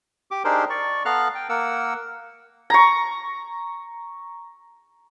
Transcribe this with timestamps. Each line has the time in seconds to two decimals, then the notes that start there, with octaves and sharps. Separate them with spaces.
0.31 G4 D6
0.44 D4 D#4 G4 G#4 A#4 C5
0.70 D5 C#6
1.05 B3 A4 F5 A#5 F6 F#6
1.35 G5
1.49 A#3 A#4 F#5 E6
2.70 A#5 C#6